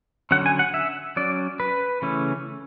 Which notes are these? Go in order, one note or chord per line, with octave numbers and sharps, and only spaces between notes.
D3 F#3 C#4 F#5
G#5
F#5
E5
F#3 C#4 D5
B4
C#3 E3 A3 C#4